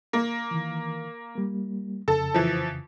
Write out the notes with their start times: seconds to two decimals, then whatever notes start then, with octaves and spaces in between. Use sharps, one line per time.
0.13 A#3
0.51 D#3 E3
1.35 G3 A#3
2.08 F2 C#3 A4
2.34 E3 F3